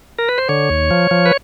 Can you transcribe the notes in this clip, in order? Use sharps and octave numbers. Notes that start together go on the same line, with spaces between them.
A#4
B4
C5
D3 C#5
D#2
F3
F3
B4